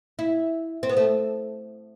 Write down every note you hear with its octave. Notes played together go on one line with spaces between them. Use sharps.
E4
C4
B3
A3